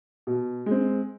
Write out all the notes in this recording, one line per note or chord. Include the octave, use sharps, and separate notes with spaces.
B2
G#3 C4